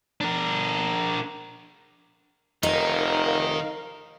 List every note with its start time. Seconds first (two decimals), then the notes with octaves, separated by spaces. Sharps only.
0.21 D4 A#4
2.63 F1 D#3 D#4 A#4 F5